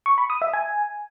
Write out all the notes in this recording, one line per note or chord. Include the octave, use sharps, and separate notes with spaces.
C#6
B5
D#6
E5
G#5